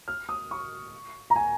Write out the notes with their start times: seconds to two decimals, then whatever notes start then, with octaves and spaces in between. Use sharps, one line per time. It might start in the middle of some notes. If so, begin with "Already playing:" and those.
0.08 F6
0.29 D#6
0.51 C#6
1.30 A#5
1.36 G#5